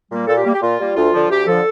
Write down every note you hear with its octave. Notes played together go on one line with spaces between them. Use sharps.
A#2 G3 A#3
A#2 A4
G4
G3 A#3
G4
A#2 F4
G3 A#3
D2 F4
D3 F3
D2 G4
D3 F3 A4